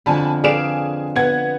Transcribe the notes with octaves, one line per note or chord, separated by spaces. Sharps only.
F2 D3 G#5 A5 B5
G#4 B4 D5 F5 D7 E7
B3 F#5 G#6